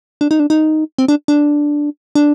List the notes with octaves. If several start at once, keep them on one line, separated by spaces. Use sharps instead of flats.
D4
D#4
D4
D#4
C4
D4
D4
D4